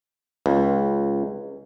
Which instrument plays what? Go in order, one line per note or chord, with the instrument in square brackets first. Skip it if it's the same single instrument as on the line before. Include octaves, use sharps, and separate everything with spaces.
[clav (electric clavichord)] C#2